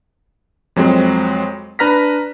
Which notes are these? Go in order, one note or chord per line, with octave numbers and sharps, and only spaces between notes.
F2 F#3 G#3 C4
D4 B4 A#5 F6 A#6 B6